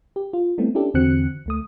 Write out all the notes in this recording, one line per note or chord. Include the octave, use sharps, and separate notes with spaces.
G4
F4
G3 A3 B3 C4 E4
C#4 D4 E4 G4 A4
E2 D3 C4 F#4 F#6 C#7
D2 A3 D#6